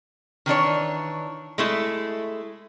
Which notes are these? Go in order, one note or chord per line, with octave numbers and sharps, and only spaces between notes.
D#3 E3 D4 C#5
G#3 A3 E4